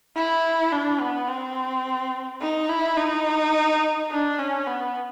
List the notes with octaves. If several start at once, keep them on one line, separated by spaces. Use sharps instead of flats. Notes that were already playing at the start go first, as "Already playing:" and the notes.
E4
D4
B3
C4
D#4
E4
D#4
D4
C#4
B3